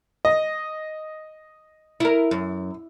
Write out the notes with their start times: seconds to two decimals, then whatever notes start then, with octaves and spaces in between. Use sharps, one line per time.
0.25 D#5
2.00 E4 A#4
2.31 F#2